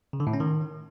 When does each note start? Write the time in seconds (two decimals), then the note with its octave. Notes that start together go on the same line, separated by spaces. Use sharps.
0.13 C#3
0.20 D3
0.27 A2
0.33 C#4
0.40 D#3